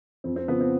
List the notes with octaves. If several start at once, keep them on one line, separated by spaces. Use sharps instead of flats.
F2 C4
C4
C#3 F3 B3
C4